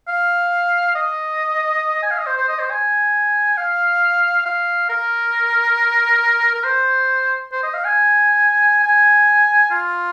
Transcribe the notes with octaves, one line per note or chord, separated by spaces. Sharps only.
F5
D#5
G#5
F5
D#5
C5
C5
D#5
C5
G#5
F5
F5
A#4
A#4
C5
C5
D#5
F5
G#5
G#5
F4